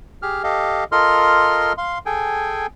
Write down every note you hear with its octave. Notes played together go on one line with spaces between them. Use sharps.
G4 G#4 F6
G4 A4 D#5 F5
F4 A4 A#4 D#5 C6 F6
F5 C6
G#4 A4 G5 G#5